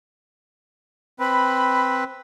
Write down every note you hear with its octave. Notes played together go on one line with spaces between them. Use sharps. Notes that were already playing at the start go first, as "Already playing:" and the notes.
C4 B4 B5